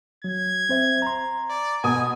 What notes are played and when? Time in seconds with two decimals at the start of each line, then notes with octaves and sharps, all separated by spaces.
0.24 F#3 G#6
0.69 C4 C5 E5
1.02 A#5 C6
1.50 D5
1.84 B2 G#5 D#6